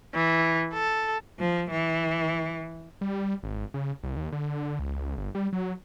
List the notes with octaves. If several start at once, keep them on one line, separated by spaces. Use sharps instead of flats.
E3
A4
F3
E3
G3
G#1
C#3
C2
D#2
D3
C#2
G1
G3
F#3